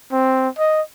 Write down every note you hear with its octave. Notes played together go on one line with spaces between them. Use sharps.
C4
D#5